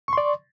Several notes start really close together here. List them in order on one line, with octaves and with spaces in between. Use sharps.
C#6 C6 D5